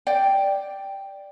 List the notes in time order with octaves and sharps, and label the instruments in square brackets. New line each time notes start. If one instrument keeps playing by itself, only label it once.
[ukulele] D5 G5